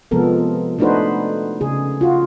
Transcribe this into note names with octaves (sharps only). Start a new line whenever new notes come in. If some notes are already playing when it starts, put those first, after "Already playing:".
C3 F3 G#3 B3 A4 A#4
A3 D4 D#4 F#4 B4 C5
C#3 G#4
F4 F#4